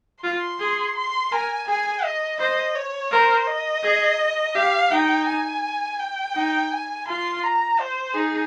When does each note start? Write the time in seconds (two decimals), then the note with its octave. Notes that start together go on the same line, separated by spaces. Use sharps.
0.23 F4 C6
0.60 G#4
0.96 C6
1.32 A#4 G#5
1.68 G#4 G#5
2.04 D#5
2.39 C5 D#5
2.75 C#5
3.11 A#4 C5
3.47 D#5
3.83 G#4
4.55 G4 F5
4.91 D#4 G5
5.27 G#5
5.99 G5
6.35 D#4
6.71 G#5
7.07 F4 C6
7.44 A#5
7.80 C5
8.14 D#4 G#4